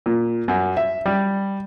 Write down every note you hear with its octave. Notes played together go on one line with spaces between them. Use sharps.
A#2
F#2
E5
G3